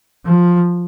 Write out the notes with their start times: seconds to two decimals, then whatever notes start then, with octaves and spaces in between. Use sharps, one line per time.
0.25 F3